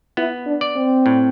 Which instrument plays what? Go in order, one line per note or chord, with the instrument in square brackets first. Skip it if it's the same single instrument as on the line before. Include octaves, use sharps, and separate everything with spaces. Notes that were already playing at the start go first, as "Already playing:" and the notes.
[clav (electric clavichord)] B3 [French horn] E4
[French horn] D4
[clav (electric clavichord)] D5
[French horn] C4
[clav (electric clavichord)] A2